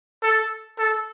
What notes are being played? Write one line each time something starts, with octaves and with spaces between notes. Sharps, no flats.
A4
A4